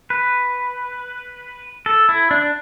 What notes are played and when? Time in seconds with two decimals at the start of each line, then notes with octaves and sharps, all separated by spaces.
0.10 B4
1.86 A4
2.09 E4
2.31 D4